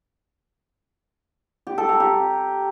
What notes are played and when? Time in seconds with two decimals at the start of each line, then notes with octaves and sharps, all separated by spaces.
1.67 G4
1.78 A4
1.89 A#5
2.00 G4